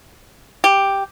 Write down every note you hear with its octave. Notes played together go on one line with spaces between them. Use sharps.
G4